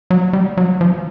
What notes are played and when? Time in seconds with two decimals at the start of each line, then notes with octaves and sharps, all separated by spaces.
0.11 F#3
0.33 G3
0.57 F#3
0.81 F3